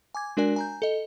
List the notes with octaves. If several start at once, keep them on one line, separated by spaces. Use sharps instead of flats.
G#5 D6 G#6
G#3 D4 F#4 A#4 D5 G#5
G#5 A#5 G6
A4 D#5